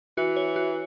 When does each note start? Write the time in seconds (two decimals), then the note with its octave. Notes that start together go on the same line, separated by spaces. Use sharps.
0.17 E3 F#4
0.36 C#5
0.56 F#4